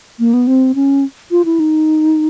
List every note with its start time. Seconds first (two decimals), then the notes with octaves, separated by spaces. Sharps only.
0.19 A#3
0.34 B3
0.47 C4
0.75 C#4
1.31 F4
1.45 E4
1.60 D#4